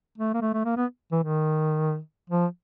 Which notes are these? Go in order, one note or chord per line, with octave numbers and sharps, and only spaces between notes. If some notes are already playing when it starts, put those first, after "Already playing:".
A3
A#3
A3
A3
A#3
B3
E3
D#3
F3